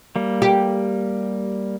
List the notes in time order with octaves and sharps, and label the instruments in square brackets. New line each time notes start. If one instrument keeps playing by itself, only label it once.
[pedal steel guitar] G3 A#3
[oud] G4